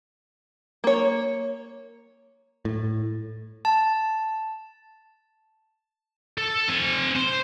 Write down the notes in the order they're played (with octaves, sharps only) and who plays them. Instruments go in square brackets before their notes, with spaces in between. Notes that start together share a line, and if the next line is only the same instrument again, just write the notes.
[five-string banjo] A#3 C#5
[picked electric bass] A2
[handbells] A5
[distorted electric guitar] A4
C4 G#5
C5